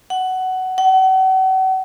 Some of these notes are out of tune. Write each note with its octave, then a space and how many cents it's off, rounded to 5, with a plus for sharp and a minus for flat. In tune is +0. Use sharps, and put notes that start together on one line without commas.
F#5 +15
F#5 +40